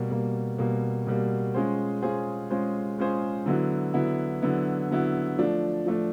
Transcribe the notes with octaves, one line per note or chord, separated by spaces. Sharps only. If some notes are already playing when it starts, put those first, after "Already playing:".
Already playing: B2 G3 A#3
B2 G3 A#3
B2 G3 A#3
B2 G3 A#3
G#3 C#4 F4 G#4 C5
G#3 C#4 F4 G#4 C5
G#3 C#4 F4 G#4 C5
G#3 C#4 F4 G#4 C5
D3 F#3 B3 E4
D3 F#3 B3 E4
D3 F#3 B3 E4
D3 F#3 B3 E4
F3 A3 D4
F3 A3 D4